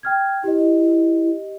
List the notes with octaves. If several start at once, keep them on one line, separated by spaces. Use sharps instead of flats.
G5 F6 G#6
E4 G4 D#5